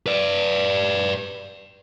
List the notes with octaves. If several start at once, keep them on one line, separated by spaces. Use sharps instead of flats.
B4 D5